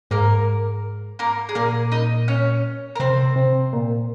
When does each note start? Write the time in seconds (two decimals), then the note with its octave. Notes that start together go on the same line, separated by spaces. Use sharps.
0.11 G#2 A#3 A#4
1.19 A#3 A#4
1.49 G#4
1.55 A#2 A#3 A#4
1.92 D#4 D#5
2.28 C#4 C#5
2.95 A#4
3.00 C3 C4 C5
3.36 C3
3.73 A#2